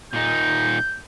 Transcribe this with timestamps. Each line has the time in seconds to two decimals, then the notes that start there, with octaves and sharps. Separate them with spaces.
0.13 A#2 D#4 G6